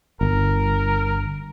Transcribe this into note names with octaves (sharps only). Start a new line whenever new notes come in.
G1 A#4